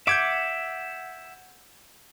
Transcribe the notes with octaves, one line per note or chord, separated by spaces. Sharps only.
E5 F#5 D6 G6 G#6 D7